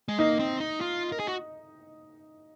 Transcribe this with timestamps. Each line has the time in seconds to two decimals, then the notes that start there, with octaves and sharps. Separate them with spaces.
0.08 G#3
0.19 A#3 D#4
0.39 C4
0.60 D#4
0.81 F4
1.12 A#4
1.20 G#4
1.27 F#4